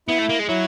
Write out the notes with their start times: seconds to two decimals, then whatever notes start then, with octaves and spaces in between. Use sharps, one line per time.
0.08 B3 E4
0.18 A3
0.29 A#3
0.39 G#3
0.48 F#3 E4